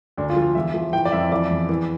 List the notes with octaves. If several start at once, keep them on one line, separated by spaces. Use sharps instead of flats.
D2 D4
F4
F3
F4
E2 E5
F3
E3 G5
D5
F2 E5
E3 D5
E2
E3